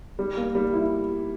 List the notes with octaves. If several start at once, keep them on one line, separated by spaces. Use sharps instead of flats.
G3
A#3
G3
E4